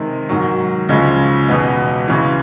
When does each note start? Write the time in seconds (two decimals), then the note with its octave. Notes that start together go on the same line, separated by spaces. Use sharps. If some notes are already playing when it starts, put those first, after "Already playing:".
Already playing: C3 D#3 G#3
0.29 G#2 D#3 F#3
0.89 C#2 C#3 F3 G#3
1.48 E2 B2 G#3 B3 D#4
2.08 C#2 C#3 E3